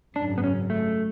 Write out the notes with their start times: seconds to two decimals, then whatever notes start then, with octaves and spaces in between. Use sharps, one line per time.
0.16 G#1 F#2 C#3 D4
0.38 B3
0.44 C#4
0.70 A3